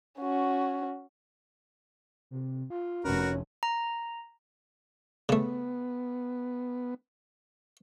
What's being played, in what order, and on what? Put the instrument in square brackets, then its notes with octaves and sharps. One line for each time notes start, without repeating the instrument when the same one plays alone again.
[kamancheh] C#4 F#4
[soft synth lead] C3
F4
[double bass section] F1 [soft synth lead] C#4 [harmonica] F#4 A#4 B4
[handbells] A#5
[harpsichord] C#3 A3 [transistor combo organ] B3